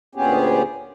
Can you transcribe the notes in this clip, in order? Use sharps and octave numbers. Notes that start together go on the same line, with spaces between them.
D2 A#2 B3 C#4 G4 G#4